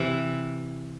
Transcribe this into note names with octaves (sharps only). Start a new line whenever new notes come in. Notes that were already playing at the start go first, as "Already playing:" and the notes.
Already playing: C3 E3